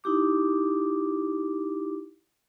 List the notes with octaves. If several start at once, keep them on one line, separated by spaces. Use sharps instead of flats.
D#4 E4 G4 D6